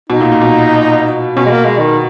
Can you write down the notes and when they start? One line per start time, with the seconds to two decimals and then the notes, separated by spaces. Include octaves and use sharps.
0.10 B2 D#4
0.21 A#2
0.32 A#2
0.42 B2
1.36 B2 C#4
1.45 G#3
1.50 A#3
1.65 G#3
1.78 D#3